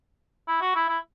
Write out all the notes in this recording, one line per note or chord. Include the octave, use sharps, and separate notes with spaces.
E4
F#4
E4
E4